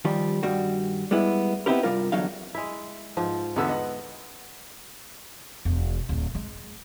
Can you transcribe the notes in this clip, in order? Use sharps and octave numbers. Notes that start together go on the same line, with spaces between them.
D#2 D#3 F3 G3
G2 D#3 G3 F#4
G3 G#3 B3 E4
B3 C4 D#4 E4 G4 A#4
C2 G2 B2 G3 F4 A#4
E2 D3 F#3 D#4 F5
G#3 E4
G#2 F3
E2 D3 G#3 B3 E6
D#5 F#5
E1
D1 E4
G#3